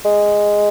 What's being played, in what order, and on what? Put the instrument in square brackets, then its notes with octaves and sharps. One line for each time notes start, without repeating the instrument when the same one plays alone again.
[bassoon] G#3